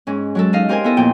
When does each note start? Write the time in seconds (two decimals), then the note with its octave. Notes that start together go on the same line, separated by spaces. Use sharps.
0.07 G#2 C#4
0.35 F#3 G#3 A4
0.53 D#4 D#5 F5
0.69 C4 G4 A#4 C5 G#5
0.84 B3 E4 A4 D#5
0.97 F2 A#2 G5